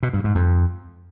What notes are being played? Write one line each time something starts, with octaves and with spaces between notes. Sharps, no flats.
B2
G2
G#2
F2